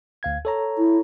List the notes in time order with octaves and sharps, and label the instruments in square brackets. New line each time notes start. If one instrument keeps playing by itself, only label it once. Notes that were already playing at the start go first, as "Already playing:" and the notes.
[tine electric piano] D2 F5 G#6
A4 C#5 A#5
[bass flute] E4